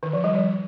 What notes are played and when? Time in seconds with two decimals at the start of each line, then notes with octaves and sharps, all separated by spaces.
0.03 D#3
0.13 F3
0.24 G3
0.35 F3